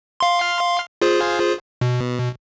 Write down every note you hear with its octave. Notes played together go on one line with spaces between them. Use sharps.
F5 C6
F4 G#4 C5
B2